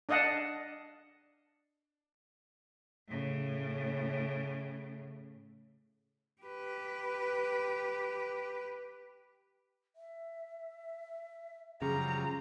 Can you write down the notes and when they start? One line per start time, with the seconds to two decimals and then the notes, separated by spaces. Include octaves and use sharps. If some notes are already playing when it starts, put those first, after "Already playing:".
0.09 D4 D5 D#5 F5 F#5 A5
3.08 A2 C#3
6.42 G4 B4
9.96 E5
11.82 F#2 C#3 F3 G3 G#4 A#5